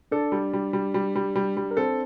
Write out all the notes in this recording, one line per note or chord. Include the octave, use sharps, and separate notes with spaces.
D4 A4 D5
G3
G3
G3
G3
G3
G3
G3
A#4
C4 A4 C5